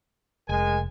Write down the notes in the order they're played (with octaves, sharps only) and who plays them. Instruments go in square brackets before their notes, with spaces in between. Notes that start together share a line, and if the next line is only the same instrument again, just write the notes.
[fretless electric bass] F1 [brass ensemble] G#3 A#4 G#5